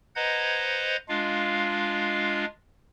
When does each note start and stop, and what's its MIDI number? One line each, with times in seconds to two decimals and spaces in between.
0.16 0.96 71
0.16 0.96 72
0.16 0.96 75
0.16 0.96 78
0.16 0.96 82
0.16 0.96 92
1.09 2.45 56
1.09 2.45 62
1.09 2.45 65
1.09 2.45 77